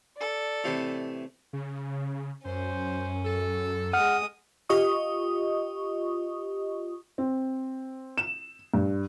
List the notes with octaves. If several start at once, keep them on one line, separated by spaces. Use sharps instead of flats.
A4 D5
A2 C3 E3
C#3
F#2 C#4 C5
A4
G#3 F#5 D#6 F6
F4 G4 D#5 C#6 D#6
C4
E7
G2